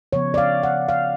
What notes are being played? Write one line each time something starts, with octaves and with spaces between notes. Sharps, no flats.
C#3 F3 B3 C#5
D5
F5
F#5
F5